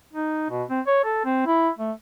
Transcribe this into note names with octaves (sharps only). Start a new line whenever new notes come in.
D#4
B2
C4
C#5
A4
C4
E4
A3